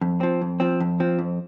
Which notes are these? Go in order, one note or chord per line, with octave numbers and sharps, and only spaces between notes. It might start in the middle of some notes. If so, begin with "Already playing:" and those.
F2
F3 C4
F2
F3 C4
F2
F3 C4
F2